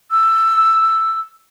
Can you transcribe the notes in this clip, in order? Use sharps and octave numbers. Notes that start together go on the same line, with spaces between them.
E6